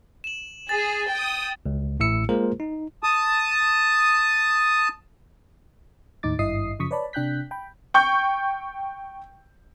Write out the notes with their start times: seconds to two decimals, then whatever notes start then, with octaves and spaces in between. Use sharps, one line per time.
0.24 E7 F#7
0.69 G#4 A6
1.10 G5 D#6
1.66 C#2
2.00 A1 A2 E4 E6 C#7
2.29 G#3 A#3 F4 G#4 A#4 C5
2.60 D#4
3.03 A5 D#6
6.23 D#2 A2 D#4 D6 A6
6.39 G#1 G2 E4 D#5 D#6 C7
6.79 F#2 C#3 F3 C#6 D#6 B6
6.91 B4 C#5 D5 A5 B5
7.13 C3 D4 G5 F#6 G6 B6
7.51 G5 B5
7.94 G5 C#6 G6